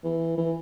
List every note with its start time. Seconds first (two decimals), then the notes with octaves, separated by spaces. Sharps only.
0.04 E3
0.37 E3